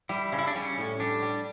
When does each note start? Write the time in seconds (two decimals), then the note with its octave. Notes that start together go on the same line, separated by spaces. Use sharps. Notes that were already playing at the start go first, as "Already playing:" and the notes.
0.09 G3 E4
0.32 C#3
0.39 E4
0.47 D4
0.54 G3 C#4
0.78 A2
1.00 G3 D4
1.22 G3